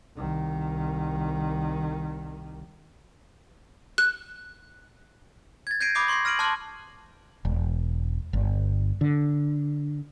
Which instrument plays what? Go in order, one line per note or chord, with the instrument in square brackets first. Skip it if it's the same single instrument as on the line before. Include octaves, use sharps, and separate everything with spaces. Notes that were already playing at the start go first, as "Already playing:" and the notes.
[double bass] C2 D#3
[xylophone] F#6
[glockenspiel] G#6 A6
G6 G#6 A#6 C7 D7 D#7
B5 D6 D#6 G6 C7
C6 C#6 G6 A#6 C7
F6 A#6 D7 D#7 F#7
A5 C6 D6 F6 F#6
[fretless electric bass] E1
G1
D3